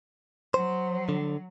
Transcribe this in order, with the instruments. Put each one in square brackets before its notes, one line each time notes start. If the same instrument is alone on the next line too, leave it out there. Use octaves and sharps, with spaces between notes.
[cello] F#3 [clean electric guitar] C5
[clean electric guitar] D3